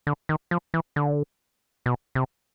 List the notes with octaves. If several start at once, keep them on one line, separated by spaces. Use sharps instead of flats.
D3
D#3
F3
E3
D3
B2
C3